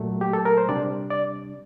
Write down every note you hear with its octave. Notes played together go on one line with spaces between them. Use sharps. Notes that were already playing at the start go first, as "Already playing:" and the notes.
Already playing: A#2 F#3 A3
G4
A4
A#4
C5
C3 G3 D4 D5
D5